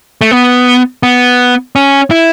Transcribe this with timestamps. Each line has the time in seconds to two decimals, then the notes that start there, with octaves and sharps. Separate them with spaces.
0.21 A3
0.31 B3
1.03 B3
1.76 C#4
2.11 E4